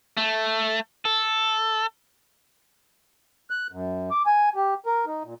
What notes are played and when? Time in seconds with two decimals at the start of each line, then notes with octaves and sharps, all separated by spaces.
0.17 A3
1.05 A4
3.50 F#6
3.72 F#2
4.11 D6
4.26 G#5
4.56 G4
4.86 A#4
5.06 D#4
5.23 A#2